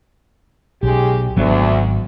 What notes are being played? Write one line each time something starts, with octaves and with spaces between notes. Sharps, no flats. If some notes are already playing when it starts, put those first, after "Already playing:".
B1 G#3 C#4 G4
G#1 D2 F#3 B3